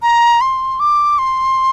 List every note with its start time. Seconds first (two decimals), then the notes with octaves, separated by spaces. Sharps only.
0.02 A#5
0.41 C6
0.80 D6
1.19 C6